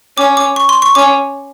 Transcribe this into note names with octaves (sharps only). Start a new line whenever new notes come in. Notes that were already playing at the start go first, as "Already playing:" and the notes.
C#4 D6
D6
C#6
C6
C#6
C#4 D6